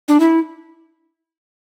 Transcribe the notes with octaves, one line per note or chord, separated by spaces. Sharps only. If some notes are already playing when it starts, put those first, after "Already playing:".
D4
E4